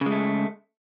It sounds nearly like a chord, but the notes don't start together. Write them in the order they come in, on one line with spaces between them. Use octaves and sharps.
C#3 G#3 A3